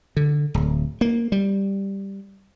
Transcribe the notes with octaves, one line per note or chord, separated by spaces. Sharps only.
D3
D1
A#3
G3